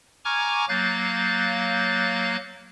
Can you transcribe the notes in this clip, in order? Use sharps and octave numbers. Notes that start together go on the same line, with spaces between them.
G#5 A#5 C#6 D6 F6 G#6
F#3 A#3 F5 F#6 G6 A6